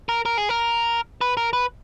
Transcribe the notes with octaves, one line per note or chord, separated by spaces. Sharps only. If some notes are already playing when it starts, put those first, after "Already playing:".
A#4
A#4
G#4
A#4
B4
A#4
B4